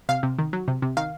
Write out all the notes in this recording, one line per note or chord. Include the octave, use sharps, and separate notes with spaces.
C3 F5
C3
D#3
F#3
C3
C3
D#3 F5